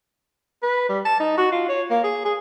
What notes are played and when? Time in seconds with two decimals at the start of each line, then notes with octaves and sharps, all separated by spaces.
0.63 B4
0.89 G3
1.05 A5
1.20 D#4
1.37 F#4
1.51 F4
1.69 C#5
1.90 A#3
2.03 G#4
2.25 G#4